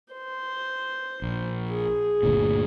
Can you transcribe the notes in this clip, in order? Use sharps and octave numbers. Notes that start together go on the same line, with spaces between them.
C5
A#1
G#4
G1 D2 A#2